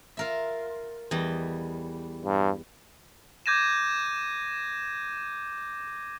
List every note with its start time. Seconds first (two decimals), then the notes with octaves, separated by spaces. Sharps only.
0.17 F4 A#4 E5
1.11 E2 G3 D#5
2.25 G2
3.46 D6 G6 G#6 A#6 D#7 E7